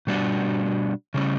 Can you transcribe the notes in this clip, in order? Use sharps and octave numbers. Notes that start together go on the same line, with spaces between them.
B2 G3 D4 F#4
C#3 G3 C#4